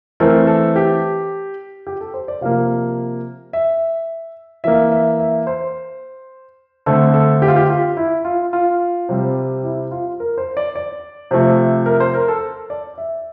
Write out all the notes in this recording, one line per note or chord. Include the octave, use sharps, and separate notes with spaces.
E3 A3 C4 A#4
A4
G4
G4
A4
C5
D5
C3 F3 A#3 F5
E5
E3 A#3 E5
E5
E5
C5
D3 A3 C4 A4
A4
G4
F4
G4
F4
E4
F4
F4
C3 G3 C4
E4
F4
A#4
C5
D5
D5
C3 F3 A3
A#4
C5
A#4
A4
D5
E5